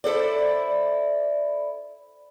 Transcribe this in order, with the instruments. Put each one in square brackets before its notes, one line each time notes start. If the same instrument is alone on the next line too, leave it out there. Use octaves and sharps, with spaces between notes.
[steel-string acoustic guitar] E4 A4 C5 D5